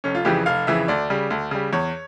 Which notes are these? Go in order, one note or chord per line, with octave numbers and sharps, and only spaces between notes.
F1 C#4
F4
F2 C#3 E3 G4
F1 F5
F2 C#3 E3 E5
D2 D5
C#3 G3
D2
C#3 G3
E2 C#5